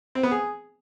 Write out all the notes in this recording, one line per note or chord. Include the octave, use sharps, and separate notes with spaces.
C4
B3
G#4